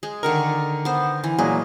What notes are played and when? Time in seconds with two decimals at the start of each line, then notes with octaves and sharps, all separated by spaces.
0.03 G#3
0.23 D3 D#3 A#4 C#6
0.85 B3 C5
1.24 E3
1.39 A#2 F#3 G#3